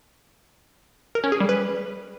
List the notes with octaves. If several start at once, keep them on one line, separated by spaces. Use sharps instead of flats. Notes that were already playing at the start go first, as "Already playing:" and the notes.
A#4
C#4
G#4
G3
B4